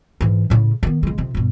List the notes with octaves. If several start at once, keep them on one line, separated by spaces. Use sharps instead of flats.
G#2 E3
A2 C#3
D#3 B3
C#3 G#3
F2 C3
G2 B2